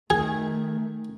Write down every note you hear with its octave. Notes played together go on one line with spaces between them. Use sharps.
D#3 A3 G#4